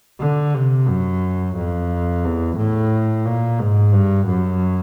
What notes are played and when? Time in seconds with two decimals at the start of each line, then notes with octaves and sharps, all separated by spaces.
0.21 D3
0.55 C3
0.88 F#2
1.56 F2
2.24 E2
2.57 A2
3.26 A#2
3.59 G#2
3.94 G2
4.27 F#2